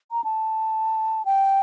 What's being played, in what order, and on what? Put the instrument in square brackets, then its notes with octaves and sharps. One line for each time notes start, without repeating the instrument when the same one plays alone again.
[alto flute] A#5
A5
G5